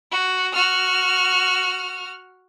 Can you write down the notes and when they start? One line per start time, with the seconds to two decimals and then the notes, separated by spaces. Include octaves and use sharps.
0.12 F#4
0.53 F#4 F6